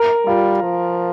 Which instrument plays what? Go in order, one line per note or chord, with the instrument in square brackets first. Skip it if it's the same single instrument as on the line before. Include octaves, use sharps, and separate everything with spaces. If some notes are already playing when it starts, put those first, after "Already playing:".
Already playing: [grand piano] A#4
[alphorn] G3 [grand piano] F4
[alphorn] F3